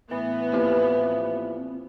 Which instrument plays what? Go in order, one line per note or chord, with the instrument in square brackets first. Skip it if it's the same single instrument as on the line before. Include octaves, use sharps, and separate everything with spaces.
[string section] A2 B3 [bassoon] E3 [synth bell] B4
[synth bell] A#3 E4 G4 [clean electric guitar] C4 F4 D5